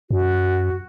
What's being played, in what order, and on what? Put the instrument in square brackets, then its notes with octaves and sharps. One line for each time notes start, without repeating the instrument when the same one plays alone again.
[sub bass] F#2 [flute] F#4